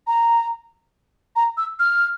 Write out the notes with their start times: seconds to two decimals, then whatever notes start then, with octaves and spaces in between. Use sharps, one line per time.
0.07 A#5
1.36 A#5
1.57 E6
1.79 F6